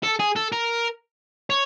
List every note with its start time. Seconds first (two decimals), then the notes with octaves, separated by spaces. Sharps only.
0.03 A4
0.19 G#4
0.36 A4
0.52 A#4
1.50 C#5